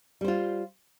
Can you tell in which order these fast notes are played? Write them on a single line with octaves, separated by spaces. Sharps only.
G3 C5 F4